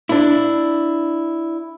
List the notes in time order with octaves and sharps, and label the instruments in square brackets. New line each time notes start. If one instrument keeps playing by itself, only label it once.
[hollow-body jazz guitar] D4 E4